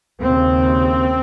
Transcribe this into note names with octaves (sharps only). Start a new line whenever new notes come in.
D#2 C#3 C4